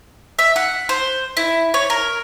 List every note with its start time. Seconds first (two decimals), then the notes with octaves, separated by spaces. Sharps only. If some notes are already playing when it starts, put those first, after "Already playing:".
0.39 E5
0.56 F#5
0.89 C5
1.37 E4
1.74 C#5
1.90 A#4